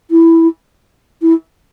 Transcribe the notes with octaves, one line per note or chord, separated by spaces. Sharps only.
E4
E4